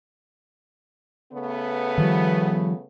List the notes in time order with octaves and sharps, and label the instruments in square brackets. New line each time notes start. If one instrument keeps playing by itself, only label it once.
[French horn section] C#3 A3 B3
[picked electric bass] D#3 F3 G3